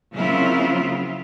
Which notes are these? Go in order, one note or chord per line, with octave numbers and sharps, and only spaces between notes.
C#3 F#3 A#3 C4 E4 F4